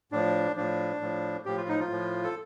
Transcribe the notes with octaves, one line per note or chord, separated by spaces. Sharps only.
A2 F3 D4
A2 F3 D4
A2 F3
A2 F3 G4
F4
D#4
F3 F4
A2 F3
A4